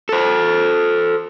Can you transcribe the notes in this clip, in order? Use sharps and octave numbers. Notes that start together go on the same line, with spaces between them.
A4 C5